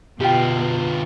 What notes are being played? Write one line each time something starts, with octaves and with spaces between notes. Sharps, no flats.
B2 D3 F4 G4 G5